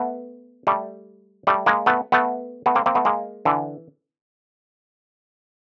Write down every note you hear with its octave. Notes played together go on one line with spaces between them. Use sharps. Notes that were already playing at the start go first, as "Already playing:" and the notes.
Already playing: A3 B3
G3 A3
G3 A3
G#3 A#3
A3 B3
A3 B3
A3 B3
A#3 C4
A#3 C4
A3 B3
G#3 A#3
D3 E3